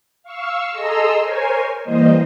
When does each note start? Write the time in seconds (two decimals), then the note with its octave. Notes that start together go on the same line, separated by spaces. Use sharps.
0.23 F5 C#6 E6
0.72 G#4 A4 D#5 A#5 C6 E6
1.19 A#4 C5 C#5 G#5
1.83 E3 G3 A#3 C5 D#5